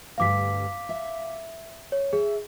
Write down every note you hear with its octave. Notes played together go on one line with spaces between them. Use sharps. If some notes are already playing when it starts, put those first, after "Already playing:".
D2 G2 G3 F5 D6 B6
E5
C#5
G#4 E5